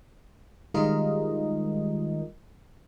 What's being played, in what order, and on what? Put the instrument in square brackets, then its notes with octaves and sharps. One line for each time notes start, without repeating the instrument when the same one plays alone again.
[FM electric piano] D#3 G3 G#3 F4 A#4 D#5